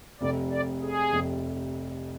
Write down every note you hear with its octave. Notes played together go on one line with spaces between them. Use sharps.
F1 F2 C3 D5
D5
G#4
F1 F2 C3